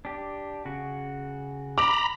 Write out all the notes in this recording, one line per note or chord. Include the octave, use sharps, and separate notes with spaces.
D4 G4
C#3 F#4
A#5 B5 D6